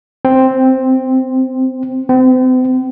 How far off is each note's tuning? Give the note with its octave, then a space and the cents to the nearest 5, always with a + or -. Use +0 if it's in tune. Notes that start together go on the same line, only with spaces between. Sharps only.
C4 +0
C4 -40